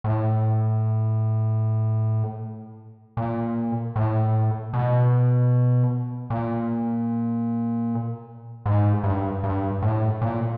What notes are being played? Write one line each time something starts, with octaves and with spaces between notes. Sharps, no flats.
A2
A#2
A2
B2
A#2
G#2
G2
G2
A2
A#2